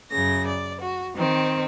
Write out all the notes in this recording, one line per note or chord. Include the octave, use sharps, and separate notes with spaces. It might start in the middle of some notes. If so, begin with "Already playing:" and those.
F#2 C#3 A#6
D5
F#4
D#3 C4